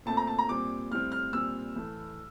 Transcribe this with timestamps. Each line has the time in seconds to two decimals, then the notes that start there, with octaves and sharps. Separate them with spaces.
0.06 A#2 A3 C4 A5
0.17 A#5
0.27 A5
0.39 A#5
0.48 A#2 G3 C4 D6
0.91 A2 G3 C4 F6
1.12 F6
1.33 A#2 G3 C4 E6
1.75 A2 E3 A3